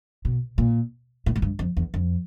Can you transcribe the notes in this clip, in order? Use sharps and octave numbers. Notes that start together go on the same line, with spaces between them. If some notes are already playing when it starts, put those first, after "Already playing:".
B2
A#2
A2
G#2
G2
F2
E2
F2